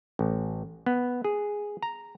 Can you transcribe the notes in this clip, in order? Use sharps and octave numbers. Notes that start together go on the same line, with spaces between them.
A1
B3
G#4
A#5